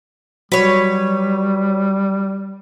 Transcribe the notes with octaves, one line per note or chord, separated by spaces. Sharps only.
F#3 G3 B4 C#5